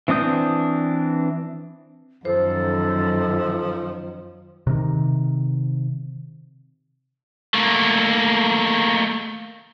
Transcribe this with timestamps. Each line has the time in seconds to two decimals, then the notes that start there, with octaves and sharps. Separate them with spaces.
0.08 E3 C4 D4 D#6 G6
2.25 F#2 D#3 F3 A4 C5
4.67 C3 D#3
7.54 A3 A#3